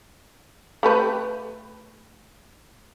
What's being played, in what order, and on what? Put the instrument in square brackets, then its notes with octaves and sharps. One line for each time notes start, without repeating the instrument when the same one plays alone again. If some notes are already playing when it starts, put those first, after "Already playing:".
[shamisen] A3 G4 B4